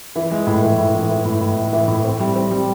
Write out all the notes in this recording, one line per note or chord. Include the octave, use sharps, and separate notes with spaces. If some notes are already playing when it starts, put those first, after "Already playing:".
E3
G#3
A2
E3
A2
E3
E3
A2
A2
A2
E3
A2
C4
G3
C4
G3